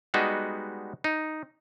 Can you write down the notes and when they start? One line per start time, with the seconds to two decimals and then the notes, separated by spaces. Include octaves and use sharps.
0.14 G3 G#3 B3 D#4 F#4
1.04 D#4